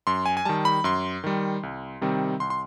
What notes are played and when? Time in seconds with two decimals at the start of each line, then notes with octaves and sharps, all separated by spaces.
0.07 F#2 C6
0.26 G#5
0.37 G#5
0.45 D#3 G3 A5
0.65 B5
0.84 F#2 C6
1.24 D#3 G3
1.63 C2
2.01 C3 D#3 G3 C4
2.40 C2 C6
2.50 C6